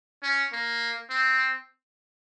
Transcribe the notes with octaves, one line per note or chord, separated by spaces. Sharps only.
C#4
A#3
C4